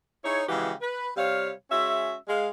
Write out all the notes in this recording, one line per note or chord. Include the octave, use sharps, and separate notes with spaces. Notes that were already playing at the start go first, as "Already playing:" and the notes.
D#4 E4 G#4 C#5
C#3 E3 F3 G#3 F#4 G4
B4
C3 G3 C#5 F5
G#3 C#4 F#4 E5
G#3 F5